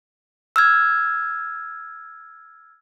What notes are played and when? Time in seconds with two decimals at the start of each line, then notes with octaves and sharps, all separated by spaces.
0.56 E6 F6 G#6